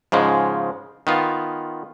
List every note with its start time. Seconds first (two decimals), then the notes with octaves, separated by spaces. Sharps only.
0.12 G#2 C#3 F3 G#3
1.07 D#3 B3 F4